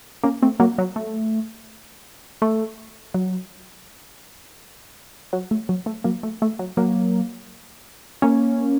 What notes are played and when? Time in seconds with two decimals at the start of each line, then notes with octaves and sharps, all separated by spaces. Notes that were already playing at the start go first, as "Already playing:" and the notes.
0.23 A#3 C#4
0.42 A3 C4
0.60 F#3 A#3
0.78 F#3
0.96 A3
2.42 A3
3.14 F#3
5.33 F#3
5.51 A3
5.69 F#3
5.86 A3
6.04 F#3 A#3
6.23 A3
6.42 A3
6.59 F#3
6.77 F#3 A#3
8.22 A#3 C#4